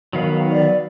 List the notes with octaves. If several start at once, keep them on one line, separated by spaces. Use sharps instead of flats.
D#3 F#3 B3 F5
D5